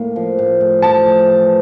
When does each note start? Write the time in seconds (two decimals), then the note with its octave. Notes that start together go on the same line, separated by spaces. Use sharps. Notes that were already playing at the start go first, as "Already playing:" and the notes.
Already playing: A2 A#3
0.16 F3
0.39 A2
0.61 A2
0.82 F3 A5
1.05 A2
1.27 E3